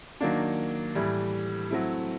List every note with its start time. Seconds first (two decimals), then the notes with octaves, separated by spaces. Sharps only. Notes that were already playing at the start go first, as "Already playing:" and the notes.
0.21 D#3 F#3 A#3 D4
0.95 A2 E3 G3
1.71 F#3 A3 C4 E4